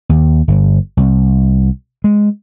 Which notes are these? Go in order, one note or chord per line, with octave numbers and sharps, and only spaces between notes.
D#2
G1
C2
G#3